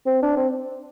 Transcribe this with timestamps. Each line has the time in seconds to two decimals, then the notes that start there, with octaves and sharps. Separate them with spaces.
0.06 C4
0.22 D4
0.37 C4